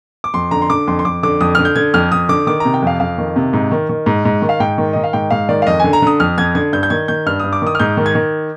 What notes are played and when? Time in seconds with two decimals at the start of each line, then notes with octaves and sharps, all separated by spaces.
0.24 D6
0.34 F2 C6
0.51 D3 A#5
0.62 C6
0.70 D3 D6
0.87 F2 C6
0.99 C6
1.05 F2 D6
1.23 D3 D6
1.41 F2 D#6
1.55 D3 F6
1.65 G6
1.76 D3 G#6
1.94 F2 F6
2.11 F2 D#6
2.29 D3 D6
2.47 D#3 D6
2.60 C3 A#5
2.74 G5
2.82 F2 F5
3.00 F2 F5
3.18 D#3
3.36 C3
3.53 G#2
3.72 D#3
3.89 D#3
4.06 G#2
4.25 G#2
4.42 D#3
4.49 F5
4.60 G#2 G5
4.78 D#3
4.93 D#3 D#5
5.04 F5
5.13 G#2 G5
5.31 G#2 F5
5.49 D#3 D5
5.62 F5
5.67 F2 D#5
5.80 D3 G#5
5.93 A#5
6.02 D3 D#6
6.20 F2 F6
6.38 F2 G#6
6.55 D3 G#6
6.73 G2 G6
6.83 G6
6.90 D#3 G#6
7.08 D#3 G6
7.26 G2 F6
7.40 G2 D#6
7.53 D6
7.62 D#3 D#6
7.75 F6
7.80 G#2 G6
7.97 D#3
8.06 G#6
8.15 D#3